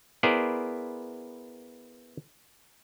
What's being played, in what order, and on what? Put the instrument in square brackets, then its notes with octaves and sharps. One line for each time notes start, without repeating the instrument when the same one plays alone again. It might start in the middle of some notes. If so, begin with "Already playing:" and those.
[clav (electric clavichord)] B3 E4 G#4 A#4 C5 D5